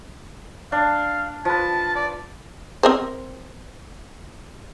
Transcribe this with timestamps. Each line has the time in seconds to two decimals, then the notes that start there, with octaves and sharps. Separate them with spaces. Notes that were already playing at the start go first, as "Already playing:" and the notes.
0.72 D4 F5
1.45 F3 B4 A5
1.95 D5
2.83 C4 A#4 C5